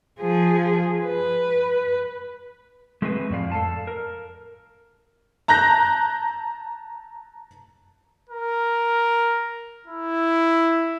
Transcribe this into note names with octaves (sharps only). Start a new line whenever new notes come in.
F3 G#4
B4
G#3 A3 C4 F#4 G#4 B4
F2 A2 D5 F5
A4 F5 A5
A#4
A5 A#5 F#6 G6 A#6
A#4
E4